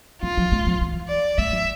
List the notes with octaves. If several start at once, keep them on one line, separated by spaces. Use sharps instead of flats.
E3 F4
F3
G#3
F3
E3
D5
G#3 E5
F3